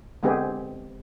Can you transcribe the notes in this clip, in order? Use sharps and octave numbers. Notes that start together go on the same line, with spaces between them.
D3 G#3 B3 C4 G4 G#4